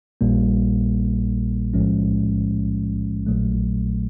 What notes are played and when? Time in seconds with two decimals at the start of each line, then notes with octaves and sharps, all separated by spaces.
0.21 A#1 A#2 G3 A#3
1.74 B1 A2 F3 G#3 C#4
3.27 A#1 A#2 F#3 A3